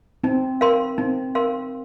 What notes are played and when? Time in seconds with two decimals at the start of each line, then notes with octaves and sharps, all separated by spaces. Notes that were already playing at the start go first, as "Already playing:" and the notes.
0.24 C4 D#4
0.61 A#4 F5 C6
0.98 C4 D#4
1.35 A#4 F5 C6